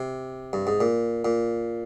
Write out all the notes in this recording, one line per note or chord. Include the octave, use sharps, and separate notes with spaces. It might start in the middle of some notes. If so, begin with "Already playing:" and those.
Already playing: C3
G2
G#2
A#2
A#2